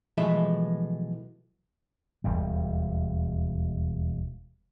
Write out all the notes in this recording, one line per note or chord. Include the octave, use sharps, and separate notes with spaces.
B1 E3 F3 G#3 A3 E5
E1 D#2 G3